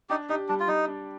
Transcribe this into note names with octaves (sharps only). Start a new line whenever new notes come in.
D4 D#4 G4
D#4 G4
G3 D4
F4
G3 D#4
D4